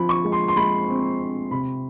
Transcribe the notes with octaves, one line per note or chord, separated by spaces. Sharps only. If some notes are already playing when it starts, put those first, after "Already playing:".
Already playing: F3 C4 B5
C#6
G#3
C6
C6
G#3 B5
C4
C4
C3 B5